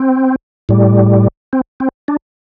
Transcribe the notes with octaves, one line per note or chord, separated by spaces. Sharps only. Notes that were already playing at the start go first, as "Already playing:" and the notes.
Already playing: C4
A2 G3
C4
C4
D4